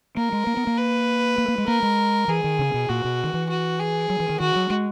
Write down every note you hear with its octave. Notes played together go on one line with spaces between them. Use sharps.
A#3 A#4
G#3
A#3
B3
A#3
B4
A#3
A#3
G#3
A#3 A#4
G#3
E3 G#4
D#3
C#3
B2
A#2 F#4
B2
D#3
E3
F#4
G#4
F#3
E3
D#3
D#3 F#4
F#3
G#3